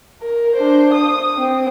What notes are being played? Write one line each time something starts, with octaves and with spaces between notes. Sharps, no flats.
A#4
D4 C5
D#6
C4